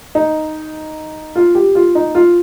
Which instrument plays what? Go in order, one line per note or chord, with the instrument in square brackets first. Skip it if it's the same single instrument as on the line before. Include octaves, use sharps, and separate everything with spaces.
[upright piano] D#4
F4
G4
F4
D#4
F4